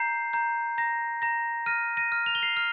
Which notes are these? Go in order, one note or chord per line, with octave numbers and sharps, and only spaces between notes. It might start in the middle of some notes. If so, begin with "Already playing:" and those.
Already playing: A#5 G6 C7
A#5 G6
A#5 A#6
A#5 A#6
F6 A#6 D#7
A#6 D#7
F6
F7
G7
C7 F7
F6